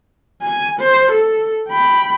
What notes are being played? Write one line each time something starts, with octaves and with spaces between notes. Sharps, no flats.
G#5
C5
A4
G5 B5